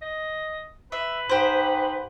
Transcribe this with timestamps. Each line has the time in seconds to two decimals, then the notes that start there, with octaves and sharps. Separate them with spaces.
0.02 D#5
0.92 B4 E5
1.29 G#2 G4 C5